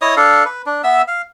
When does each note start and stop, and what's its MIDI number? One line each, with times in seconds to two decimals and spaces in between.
0.02 0.15 64
0.02 0.15 73
0.02 0.15 75
0.02 0.15 87
0.17 0.44 62
0.17 0.44 69
0.17 0.44 77
0.45 0.62 71
0.66 0.82 62
0.84 1.02 59
0.84 1.02 76
0.84 1.02 88
1.08 1.22 77